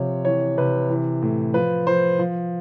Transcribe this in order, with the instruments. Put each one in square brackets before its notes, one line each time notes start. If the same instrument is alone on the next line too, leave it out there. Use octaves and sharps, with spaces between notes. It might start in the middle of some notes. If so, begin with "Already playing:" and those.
Already playing: [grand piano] C3 F3 C#5
E3 C#5
C3 B4
E3
A2
F3 B4
F3 C5
F3